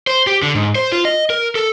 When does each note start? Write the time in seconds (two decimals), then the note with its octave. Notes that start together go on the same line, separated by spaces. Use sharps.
0.07 C5
0.27 G4
0.42 D3
0.55 G#2
0.75 C5
0.92 F4
1.05 D#5
1.30 A#4
1.55 A4